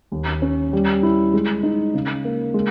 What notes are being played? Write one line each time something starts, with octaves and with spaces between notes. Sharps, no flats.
D#2
C#4
G3
E4
G#3
D#4
C#3
A#3
G#3